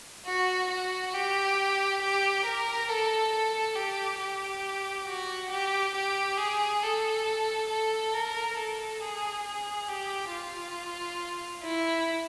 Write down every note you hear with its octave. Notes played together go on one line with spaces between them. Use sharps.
F#4
F#4
G4
G4
A#4
A4
A4
G4
G4
F#4
G4
G4
G#4
A4
A4
A#4
A4
G#4
G#4
G4
F4
E4